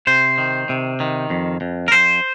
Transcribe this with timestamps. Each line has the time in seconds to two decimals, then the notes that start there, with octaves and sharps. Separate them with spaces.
0.07 C3 C5
0.38 D#3
0.69 C3
1.00 D#3
1.30 F2
1.61 F2
1.88 A#4
1.92 F2 C5